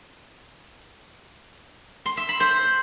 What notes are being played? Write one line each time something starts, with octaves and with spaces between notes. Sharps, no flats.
C6
E5
B5
C5